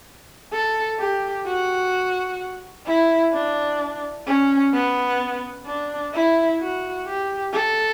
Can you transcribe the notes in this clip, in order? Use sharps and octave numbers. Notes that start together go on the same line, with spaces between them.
A4
G4
F#4
E4
D4
C#4
B3
D4
E4
F#4
G4
A4